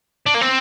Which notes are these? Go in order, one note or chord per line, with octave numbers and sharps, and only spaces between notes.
D4
A#3
C4